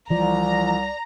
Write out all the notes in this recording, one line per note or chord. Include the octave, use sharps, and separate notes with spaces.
C2 E3 F3 D5 A#5